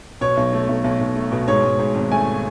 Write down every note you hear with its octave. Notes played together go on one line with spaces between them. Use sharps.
B2 C#5
B1
A3
B1
B1
B1
A3
B2
G#2 C#5
G#2
G#2
G#1
A3 G#5